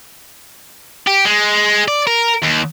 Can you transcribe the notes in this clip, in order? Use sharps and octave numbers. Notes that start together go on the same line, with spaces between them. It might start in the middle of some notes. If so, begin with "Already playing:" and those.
G4
G#3
D5
A#4
D#2